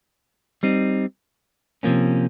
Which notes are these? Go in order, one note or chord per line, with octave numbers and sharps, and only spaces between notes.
G3 C4 D#4
C3 F3 A#3 C#4